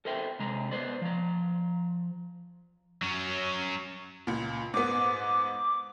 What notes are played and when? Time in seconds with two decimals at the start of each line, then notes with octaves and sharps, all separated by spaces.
0.05 A4 A#4 C5 E5 G5
0.39 C3 G#3 A#5
0.71 B3 B4 C5 D5
1.02 F3 A#5
3.02 F#3 C#4
4.27 C#2 A#2
4.74 G#2 B3 D6